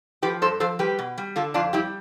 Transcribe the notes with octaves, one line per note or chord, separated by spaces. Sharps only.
F3 G4 B4
G2 A4 C5
F3 A4 C5
G3 G4 B4
B2
G3
D3 F4 A4
F2 D4 F4
G3 E4 G4